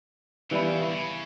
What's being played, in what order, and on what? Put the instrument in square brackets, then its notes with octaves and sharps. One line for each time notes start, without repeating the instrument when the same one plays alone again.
[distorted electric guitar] C#3 [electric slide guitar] E3 G3 B3 E4
[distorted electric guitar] D#3
D3
C#3